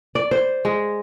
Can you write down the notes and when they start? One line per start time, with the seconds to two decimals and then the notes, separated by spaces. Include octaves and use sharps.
0.15 D5
0.31 C5
0.65 G#3